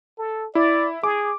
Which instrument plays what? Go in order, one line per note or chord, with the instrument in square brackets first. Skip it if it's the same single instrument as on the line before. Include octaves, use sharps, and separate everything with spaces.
[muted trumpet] A4
[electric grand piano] E4 [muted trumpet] D5
[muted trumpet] G#4 [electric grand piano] D6